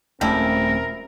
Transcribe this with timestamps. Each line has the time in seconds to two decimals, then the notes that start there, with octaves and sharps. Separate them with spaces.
0.21 D#1 F3 G3 A3 C4 C#4 E4 A#4